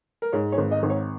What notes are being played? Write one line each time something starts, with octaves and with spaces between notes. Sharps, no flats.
A#4
G#2 C#5
C#5
G#1
D#5
G#1
C#5